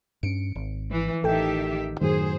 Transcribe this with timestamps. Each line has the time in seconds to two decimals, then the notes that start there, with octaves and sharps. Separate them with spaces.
0.23 G2 C#4 C#7 D7
0.55 G#1
0.91 E3
1.24 A1 D#3 G4 A4 E5 G5
2.01 F#2 A2 D#3 F#3 G#4 C5